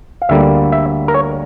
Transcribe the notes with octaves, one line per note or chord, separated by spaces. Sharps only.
F5
D2 D3 G3 A#3 E5
E5
A#4
C#5